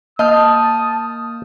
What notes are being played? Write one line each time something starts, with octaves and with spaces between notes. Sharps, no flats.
A#3 D#5 A5 D#6 F6 G6